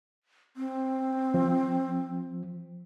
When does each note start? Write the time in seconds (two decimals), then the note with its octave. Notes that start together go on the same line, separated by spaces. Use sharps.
0.57 C4
1.34 F3